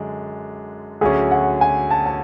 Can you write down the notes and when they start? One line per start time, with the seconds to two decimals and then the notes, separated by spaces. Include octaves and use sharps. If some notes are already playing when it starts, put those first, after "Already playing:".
Already playing: F#2 D3 G#3 D4
1.01 D2 D3 F#3 C#4 G#4
1.31 F#5
1.61 G#5
1.91 A5
2.06 A5